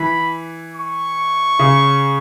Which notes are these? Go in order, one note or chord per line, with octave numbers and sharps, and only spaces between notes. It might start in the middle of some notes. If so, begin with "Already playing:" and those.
Already playing: E3 B5
C#6
C#3